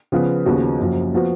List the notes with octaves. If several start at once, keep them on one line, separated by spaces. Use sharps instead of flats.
C#3 F3 B3 F4 B4
D#2 C#3 F3 B3 F#4
F#1 F#2 F3
F3 B3 F#4